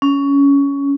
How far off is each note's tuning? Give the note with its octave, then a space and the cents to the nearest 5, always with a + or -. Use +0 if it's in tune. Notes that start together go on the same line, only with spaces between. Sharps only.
C#4 +15